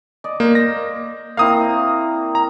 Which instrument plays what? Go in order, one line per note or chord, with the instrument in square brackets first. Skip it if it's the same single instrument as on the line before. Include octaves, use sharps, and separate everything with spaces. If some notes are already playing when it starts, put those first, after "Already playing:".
[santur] D5 D#5
[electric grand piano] A#3 [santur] C5
[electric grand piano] A#6
[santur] A#3 C4 E4 [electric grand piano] F5 D#6
[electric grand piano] A#5